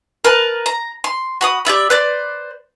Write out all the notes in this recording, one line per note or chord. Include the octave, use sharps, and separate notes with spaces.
A#4 B4 A5
A#5
C6
F#4 B5 D#6
G4 D5 E5 B5
B4 C5 D5